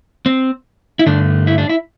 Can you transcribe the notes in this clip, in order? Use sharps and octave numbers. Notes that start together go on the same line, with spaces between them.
C4
E4
G2 D3 A3 D4
E4
D4
E4